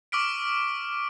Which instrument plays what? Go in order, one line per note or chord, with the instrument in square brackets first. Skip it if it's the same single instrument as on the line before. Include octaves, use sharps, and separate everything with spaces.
[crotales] C#6 D6 E6 F6 B6 D7